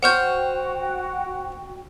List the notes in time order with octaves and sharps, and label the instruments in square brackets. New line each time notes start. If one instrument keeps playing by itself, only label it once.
[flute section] F#4 G5 [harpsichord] C5 C#5 [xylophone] F#5 F6 G6